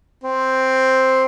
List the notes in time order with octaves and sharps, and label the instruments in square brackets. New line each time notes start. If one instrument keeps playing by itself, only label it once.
[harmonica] C4